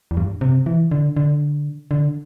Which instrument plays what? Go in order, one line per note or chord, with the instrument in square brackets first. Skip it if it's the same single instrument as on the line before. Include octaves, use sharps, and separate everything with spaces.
[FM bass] E2
G2
C3
E3
D3
D3
D3